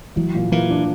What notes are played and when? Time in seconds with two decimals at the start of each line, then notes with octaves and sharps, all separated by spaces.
0.16 E3 F#3
0.35 A#2
0.52 E3 A#3
0.70 D4